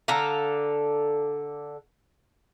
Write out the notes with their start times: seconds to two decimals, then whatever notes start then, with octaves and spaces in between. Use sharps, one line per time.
0.08 D3 A4 F5 A#5